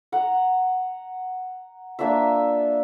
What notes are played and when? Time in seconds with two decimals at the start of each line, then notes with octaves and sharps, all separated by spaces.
0.12 F#5 A#5
1.99 A#3 D4 F4 E5